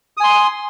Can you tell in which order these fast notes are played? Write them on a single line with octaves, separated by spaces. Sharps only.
D#6 G#5 C6